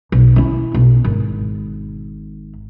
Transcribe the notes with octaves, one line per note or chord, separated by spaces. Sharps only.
B1
C#4 E4
B1
G#1